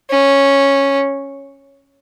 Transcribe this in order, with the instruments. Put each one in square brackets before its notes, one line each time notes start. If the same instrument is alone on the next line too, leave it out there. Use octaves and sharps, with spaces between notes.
[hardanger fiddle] C#4